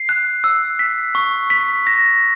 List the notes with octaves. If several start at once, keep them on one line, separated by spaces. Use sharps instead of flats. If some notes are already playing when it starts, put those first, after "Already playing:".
Already playing: C7
F#6
E6
B6
C#6
B6
A#6